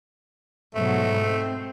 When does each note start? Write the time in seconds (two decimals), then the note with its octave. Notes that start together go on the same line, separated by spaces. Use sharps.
0.75 G#2 B2 F#3 A3
1.20 C4